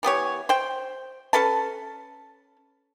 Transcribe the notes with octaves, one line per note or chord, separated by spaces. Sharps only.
E3 B3 G4 C#5
C5 G5
C#4 A4 B4 A5